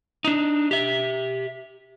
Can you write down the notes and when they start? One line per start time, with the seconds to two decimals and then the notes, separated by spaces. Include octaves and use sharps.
0.24 D4 D#4
0.71 G4 E5